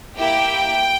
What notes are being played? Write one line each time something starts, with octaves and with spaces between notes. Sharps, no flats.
A#3 E4 G4 G5